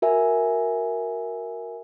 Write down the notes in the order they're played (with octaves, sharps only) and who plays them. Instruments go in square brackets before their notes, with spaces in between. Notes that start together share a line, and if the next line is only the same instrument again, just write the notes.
[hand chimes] F#4 A#4 E5 G#5